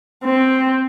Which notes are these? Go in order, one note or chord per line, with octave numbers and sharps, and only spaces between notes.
C4